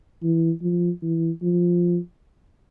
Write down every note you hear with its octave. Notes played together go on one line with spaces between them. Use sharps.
E3
F3
E3
F3